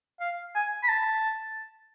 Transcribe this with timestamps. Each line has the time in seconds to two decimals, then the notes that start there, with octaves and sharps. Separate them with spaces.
0.20 F5
0.55 G#5
0.84 B5
0.89 A5